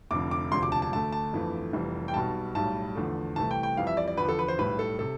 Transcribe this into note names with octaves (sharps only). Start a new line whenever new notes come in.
F1 F2 D3 D6
D6
E1 D2 C3 F3 C6
D6
A5
A5
D2 D3 A3 A5
A5
G1 F2 E3 A3
F1 F2 E3 G3
G5
B1 B2 G3 A5
B1 A2 G3 A5
E2 D3 F3 A3
C2 C3 E3 A3 A5
G5
G5
F2 E3 G3 F5
E5
D5
D5
E2 D3 F3 B4
A4
B4
C5
B1 A2 G3 B4
A4
C3 A4